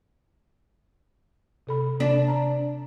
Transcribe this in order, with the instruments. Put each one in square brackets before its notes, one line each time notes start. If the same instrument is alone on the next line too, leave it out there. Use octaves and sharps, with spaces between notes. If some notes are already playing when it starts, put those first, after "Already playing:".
[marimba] C3 A4 B5
[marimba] C3 [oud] D4
[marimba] A#5